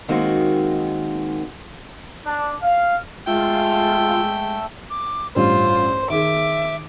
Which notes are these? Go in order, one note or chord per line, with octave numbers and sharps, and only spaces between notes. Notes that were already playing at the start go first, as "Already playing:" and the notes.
D#3 G#3 A#3 C4 D#4 F#4
D4
F5
G#3 A3 F4 A4 E5 G5
D6
A1 G2 F4 C5
D#3 G#4 E5 D6